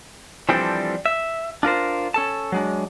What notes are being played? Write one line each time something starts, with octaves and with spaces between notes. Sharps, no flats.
E3 F3 G3 C4 D4 A4
E5
D4 F4 A#4 C5
C#4 A4 A5
F#3 G#3 D4